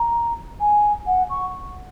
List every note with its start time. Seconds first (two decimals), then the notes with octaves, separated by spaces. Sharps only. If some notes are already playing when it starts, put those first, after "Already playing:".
Already playing: A#5
0.60 G#5
1.06 F#5
1.29 C#6